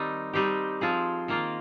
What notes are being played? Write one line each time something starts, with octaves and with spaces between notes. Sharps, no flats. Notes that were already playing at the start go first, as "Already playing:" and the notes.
Already playing: D#3 G3 C4 D#4
G3 C4 D#4 G4
F3 C4 F4 G#4
D#3 A#3 F4